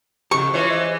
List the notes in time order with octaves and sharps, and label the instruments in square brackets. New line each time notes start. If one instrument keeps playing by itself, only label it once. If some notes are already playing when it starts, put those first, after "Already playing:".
[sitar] F2 [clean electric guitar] C#3 G4 [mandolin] C#6
[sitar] E3 G#3 [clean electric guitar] F4 C#5
[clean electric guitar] C5 D#5